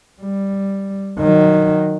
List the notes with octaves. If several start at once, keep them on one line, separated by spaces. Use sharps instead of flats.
G3
D#3 F#3